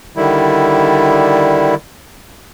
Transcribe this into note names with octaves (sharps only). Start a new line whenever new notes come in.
D3 D#3 G3 E4